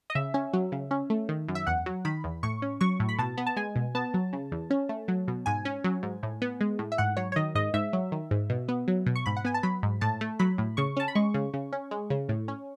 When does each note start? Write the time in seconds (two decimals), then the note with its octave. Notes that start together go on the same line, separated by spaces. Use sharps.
0.10 D#5
0.15 C#3 E5
0.34 C#4
0.53 F#3
0.72 C#3
0.91 C#4
1.10 A3
1.29 D#3
1.48 F#2
1.55 E5
1.67 E2 F#5
1.86 F#3
2.05 D#3 B5
2.24 E2
2.43 A2 C#6
2.62 C#4
2.81 F#3 C#6
3.00 A2
3.09 B5
3.18 B2 A5
3.37 B3
3.46 A5
3.56 G#3 G#5
3.76 B2
3.95 B3 A5
4.14 F#3
4.33 C#3
4.52 E2
4.70 C#4
4.89 A3
5.08 F#3
5.28 B2
5.46 G#2 G#5
5.65 C#4
5.84 F#3
6.03 G#2
6.23 A2
6.42 B3
6.61 G#3
6.79 A2
6.92 E5
6.98 G#2 F#5
7.17 F#3 C#5
7.32 C#5
7.36 D#3 D#5
7.55 G#2 D#5
7.74 G#2 E5
7.93 F#3
8.12 D#3
8.31 G#2
8.50 B2
8.68 B3
8.88 F#3
9.06 B2
9.16 C#6
9.26 G#2 B5
9.37 F#5
9.45 B3 G#5
9.54 A5
9.63 F#3 B5
9.83 G#2
10.01 A2 A5
10.21 A3
10.39 F#3 B5
10.58 A2
10.77 C#3 C#6
10.97 C#4 A5
11.08 B5
11.15 G#3 C#6
11.34 C#3
11.54 C#3
11.73 C#4
11.91 G#3
12.10 C#3
12.29 A2
12.48 C#4